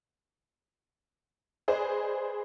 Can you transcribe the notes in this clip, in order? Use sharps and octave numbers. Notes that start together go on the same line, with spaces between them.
G#4 B4 C5 D5 D#5